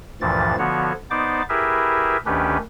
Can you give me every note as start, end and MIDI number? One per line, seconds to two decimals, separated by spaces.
0.21 0.56 38
0.21 0.56 43
0.21 0.56 46
0.21 0.56 52
0.21 0.56 53
0.21 0.56 93
0.59 0.93 50
0.59 0.93 53
0.59 0.93 59
0.59 0.93 66
0.59 0.93 73
1.11 1.42 59
1.11 1.42 63
1.11 1.42 72
1.11 1.42 74
1.11 1.42 86
1.49 2.17 64
1.49 2.17 67
1.49 2.17 68
1.49 2.17 70
1.49 2.17 71
1.49 2.17 76
2.26 2.57 38
2.26 2.57 51
2.26 2.57 61
2.26 2.57 62
2.26 2.57 67
2.26 2.57 71